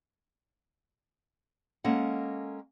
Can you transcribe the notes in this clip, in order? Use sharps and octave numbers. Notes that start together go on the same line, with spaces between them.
G#3 A#3 C#4 A4 F#5